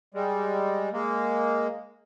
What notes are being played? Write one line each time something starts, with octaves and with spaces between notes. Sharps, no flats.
G3 G#3
G#3 A#3